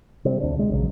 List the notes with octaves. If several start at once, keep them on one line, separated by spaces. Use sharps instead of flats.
C3 G3 C4
D2 C3 D4
C3 G#3
A#1 C#3 E3 F#3